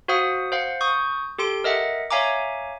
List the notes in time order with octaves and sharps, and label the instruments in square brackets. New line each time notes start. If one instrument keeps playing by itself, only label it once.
[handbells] F#4 C5 F5 F#5 D#6
C5 F5 F#5
C#6 D#6 G6
G4 A4 C6 D7
A#4 D#5 E5 F#5
C#5 E5 F5 G#5 A#5 D6